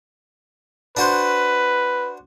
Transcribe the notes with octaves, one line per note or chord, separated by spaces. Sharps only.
D4 F#4 B4 C5